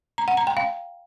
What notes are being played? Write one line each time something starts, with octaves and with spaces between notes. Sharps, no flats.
A#5
F#5
A#5
G5
F5